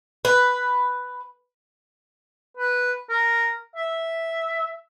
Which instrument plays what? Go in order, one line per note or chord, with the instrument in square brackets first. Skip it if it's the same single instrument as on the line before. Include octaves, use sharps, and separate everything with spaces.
[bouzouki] B4
[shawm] B4
A#4
E5